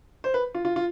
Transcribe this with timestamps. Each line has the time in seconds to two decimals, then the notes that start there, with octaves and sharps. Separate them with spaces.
0.24 C5
0.34 B4
0.55 F4
0.65 F4
0.76 F4